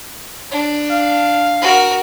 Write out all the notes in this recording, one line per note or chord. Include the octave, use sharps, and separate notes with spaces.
D4
F5
F#4 A#4